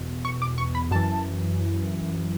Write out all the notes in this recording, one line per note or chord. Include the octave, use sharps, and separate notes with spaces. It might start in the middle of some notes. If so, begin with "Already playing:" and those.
Already playing: E2 B2
C#6
D6
C#6
B5
F#2 E3 A5